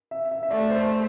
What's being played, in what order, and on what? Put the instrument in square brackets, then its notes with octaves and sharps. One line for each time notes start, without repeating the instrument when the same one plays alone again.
[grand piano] E5
E5
E5
[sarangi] A3 [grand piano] D5
[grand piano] C5